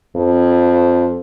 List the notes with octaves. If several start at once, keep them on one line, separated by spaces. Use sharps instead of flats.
F2